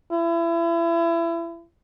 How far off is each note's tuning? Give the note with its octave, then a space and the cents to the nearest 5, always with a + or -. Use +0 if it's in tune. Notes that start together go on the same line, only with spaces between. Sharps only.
E4 +30